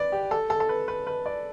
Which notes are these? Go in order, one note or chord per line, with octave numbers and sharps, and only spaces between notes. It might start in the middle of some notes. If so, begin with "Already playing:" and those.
Already playing: B4 D5
G4
A4
A4
A4
B4
B4
B4
D5